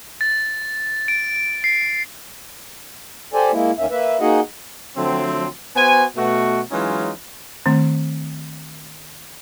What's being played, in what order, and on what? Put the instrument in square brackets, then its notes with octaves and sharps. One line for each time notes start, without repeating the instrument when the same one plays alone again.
[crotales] A6
D7
C7
[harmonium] G4 A4 C5 D5 G#5
G#3 A#3 E4
D2 D#3 A#3 C#4 E5
A#3 B4 E5
A#3 D#4 F#4 G#4 D#5 F#5
[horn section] D3 F3 F#3 A3 C4
B3 F#4 C5 G#5
B2 A3 F#4
E3 F#3 G#3 C#4 D#4 F4
[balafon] D#3 A3 C4